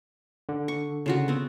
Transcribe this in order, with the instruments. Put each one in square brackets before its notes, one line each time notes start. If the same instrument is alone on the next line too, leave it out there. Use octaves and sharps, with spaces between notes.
[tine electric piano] D3
[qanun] C#6
C#3 F4 F#4
B3 C4